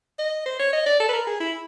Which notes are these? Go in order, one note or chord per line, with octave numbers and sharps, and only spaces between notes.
D#5
C5
C#5
D#5
D5
A4
B4
A#4
G#4
E4